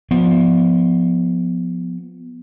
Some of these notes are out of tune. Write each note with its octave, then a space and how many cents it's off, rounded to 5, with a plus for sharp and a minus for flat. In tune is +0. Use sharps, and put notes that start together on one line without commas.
F3 +15 B3 +0